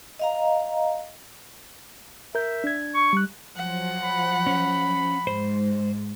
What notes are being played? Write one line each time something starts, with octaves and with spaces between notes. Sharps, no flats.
D#5 F5 A#5
A#4 E5 G6
D4 G#6
C#6
G3 F#6
F3 F#3 F#5
B5
C#4
G#2 G#3 C5